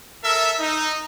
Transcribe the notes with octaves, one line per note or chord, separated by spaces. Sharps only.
A4 A#4 E5
D#4